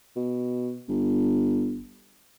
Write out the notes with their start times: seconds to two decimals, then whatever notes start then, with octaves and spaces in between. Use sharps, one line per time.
0.16 B2
0.88 G1